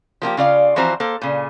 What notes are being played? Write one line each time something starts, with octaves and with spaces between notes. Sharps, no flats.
F3 A#3 F4 G4
C#3 F4 D5 F5
E3 F3 C4 F#4 C5 A#5
A#3 A4 C5
A#2 C#3